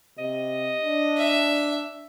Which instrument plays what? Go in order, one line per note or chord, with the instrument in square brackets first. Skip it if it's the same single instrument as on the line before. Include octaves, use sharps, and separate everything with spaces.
[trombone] C3 [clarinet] D#5
[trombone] D4
[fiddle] E5